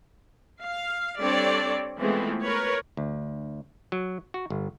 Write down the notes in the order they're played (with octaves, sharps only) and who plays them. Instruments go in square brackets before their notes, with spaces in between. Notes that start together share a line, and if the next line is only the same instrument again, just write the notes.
[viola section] F5
G3 C4 D4 A4 C#5 D5
E3 F3 G#3 A3 B3 C4
A#4 B4 C#5
[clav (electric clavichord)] D2
F#3
F#4
G1